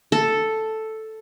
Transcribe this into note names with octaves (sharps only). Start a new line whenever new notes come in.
A4